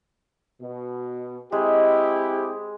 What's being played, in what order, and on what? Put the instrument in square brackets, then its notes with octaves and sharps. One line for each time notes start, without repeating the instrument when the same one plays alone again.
[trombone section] B2
[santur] G#3 [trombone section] C4 E4 G4